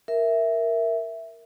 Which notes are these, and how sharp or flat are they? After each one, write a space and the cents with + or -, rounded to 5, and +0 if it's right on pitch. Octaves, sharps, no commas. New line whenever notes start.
A#4 +0 E5 +0